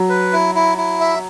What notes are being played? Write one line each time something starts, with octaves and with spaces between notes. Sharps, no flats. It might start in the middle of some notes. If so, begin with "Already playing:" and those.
Already playing: F#3
B4
E4
E4
E4
E5